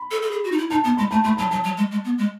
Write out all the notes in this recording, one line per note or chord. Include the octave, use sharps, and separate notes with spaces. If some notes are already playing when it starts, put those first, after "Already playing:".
Already playing: B5
A4
A4
G#4
F#4
D#4
E4
D#4 A5
B3 A5
G#3 B5
A3 A5
A3 B5
F#3 A5
F#3 A5
F#3
G#3
G#3
B3
G#3